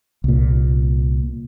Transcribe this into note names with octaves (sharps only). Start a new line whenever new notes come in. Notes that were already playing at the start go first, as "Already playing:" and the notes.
C2 A#2